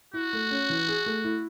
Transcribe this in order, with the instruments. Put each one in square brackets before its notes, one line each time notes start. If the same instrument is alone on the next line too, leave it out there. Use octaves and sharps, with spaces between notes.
[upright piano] E4 [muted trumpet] F#4
[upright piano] A3
C#4
E3
G#4
A3
E4